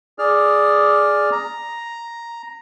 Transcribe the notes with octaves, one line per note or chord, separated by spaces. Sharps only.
G#4 D5 F6
A#5